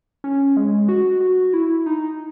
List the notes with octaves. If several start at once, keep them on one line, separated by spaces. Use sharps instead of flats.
C#4
G#3
F#4
F#4
E4
D#4